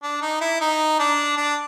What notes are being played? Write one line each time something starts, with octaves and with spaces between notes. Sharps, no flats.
D4
D#4
E4
D#4
D4
D4